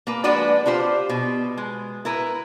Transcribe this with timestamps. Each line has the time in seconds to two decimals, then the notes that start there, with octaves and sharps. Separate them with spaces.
0.07 A#3 B4
0.24 F3 G#3 D4 F#4 B4 D5
0.66 D4 F4 G4 C5
1.09 B2
1.57 G#3
2.05 E4 A#4 B4